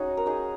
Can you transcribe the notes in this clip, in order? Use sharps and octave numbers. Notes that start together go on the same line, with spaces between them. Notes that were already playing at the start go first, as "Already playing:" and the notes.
Already playing: C#4 D#4 F#4 G#4
A#4
D#4 G#4